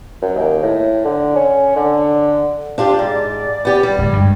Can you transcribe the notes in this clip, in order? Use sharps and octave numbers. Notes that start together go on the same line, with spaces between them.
F#2
D#2
A2
D3
C#4
D3
D4 F4 G4 F5
G#2 D5
B3 G4
G3
D1 G#3
G2 F#3 G#3